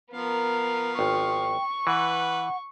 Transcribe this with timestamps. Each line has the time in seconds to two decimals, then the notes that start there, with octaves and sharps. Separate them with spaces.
0.13 F3 B3 A#4 F5
0.99 G#1 G5 C#6
1.87 E3 B4 F#5